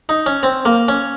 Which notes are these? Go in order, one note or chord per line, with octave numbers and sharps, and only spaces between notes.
D#4
C#4
C4
A#3
C#4